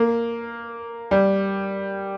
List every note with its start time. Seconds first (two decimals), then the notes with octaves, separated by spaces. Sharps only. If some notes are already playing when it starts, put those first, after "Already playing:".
Already playing: A#3
1.11 G3